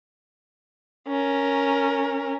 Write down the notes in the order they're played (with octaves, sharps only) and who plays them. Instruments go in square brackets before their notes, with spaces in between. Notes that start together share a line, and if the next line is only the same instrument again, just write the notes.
[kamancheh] C#4 A#4